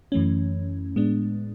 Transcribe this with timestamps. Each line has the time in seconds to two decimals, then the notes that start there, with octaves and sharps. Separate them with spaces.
0.12 F#2 E3 A3 C#4
0.96 A2 G#3 B3 D4